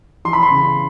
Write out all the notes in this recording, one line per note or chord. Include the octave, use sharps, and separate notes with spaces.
E3 C6
B5
C6
C#3